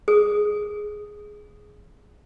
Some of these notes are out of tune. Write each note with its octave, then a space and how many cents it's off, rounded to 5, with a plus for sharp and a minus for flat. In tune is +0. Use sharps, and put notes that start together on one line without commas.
G#4 +5 D#6 +0